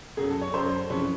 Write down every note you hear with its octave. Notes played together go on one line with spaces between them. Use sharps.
F#2 C#3 F#3 G#4
A4
C#5
F#2 C#3 F#3 C5
F2 C#3 E3 C#5